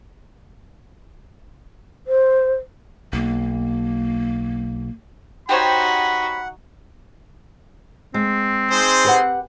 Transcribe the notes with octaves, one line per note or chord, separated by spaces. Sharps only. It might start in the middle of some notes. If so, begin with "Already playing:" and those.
C5
B1 A#3
D#4 F#4 G4 C5 C#5 F#5 B5
G#3 C4
D#4 G#4 C5
G4 B4 F#5